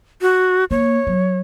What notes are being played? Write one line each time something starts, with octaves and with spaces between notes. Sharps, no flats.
F#4
A#3 C#5
F#3